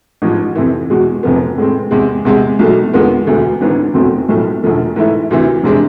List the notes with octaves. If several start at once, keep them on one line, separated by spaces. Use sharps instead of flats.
A1 G#2 F3
F2 C3 E3
E2 B2 G#3
F1 F2 C3 F3 B3
A2 G#3 C4
E2 C3 G#3
E2 C3 G#3
B1 B2 A3
E2 D3 G#3 B3 F4
E1 D2 D3
G#1 G#2 E3 B3 D4
F1 E2 B2 A3 C4
B1 A2 F3 A3
E1 E2 D3 F3 A3
G#2 E3 A3 E4
D2 C3 E3
F1 C3 G#3 D4